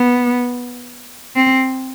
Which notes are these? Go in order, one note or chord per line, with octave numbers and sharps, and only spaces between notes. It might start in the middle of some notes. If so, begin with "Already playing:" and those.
Already playing: B3
C4